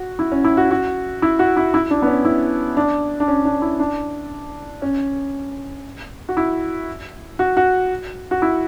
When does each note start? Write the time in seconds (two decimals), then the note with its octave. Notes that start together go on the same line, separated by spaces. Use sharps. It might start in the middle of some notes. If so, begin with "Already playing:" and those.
Already playing: F#4
0.19 E4
0.32 C#4
0.45 E4
0.57 F#4
0.71 F#4
1.22 E4
1.39 F#4
1.57 E4
1.74 E4
1.91 D4
2.02 B3
2.07 C#4
2.25 E4
2.77 D4
3.20 D4
3.28 C#4
3.45 D4
3.62 E4
3.80 D4
4.82 C#4
6.29 F#4
6.37 E4
7.39 F#4
7.57 F#4
8.31 F#4
8.42 E4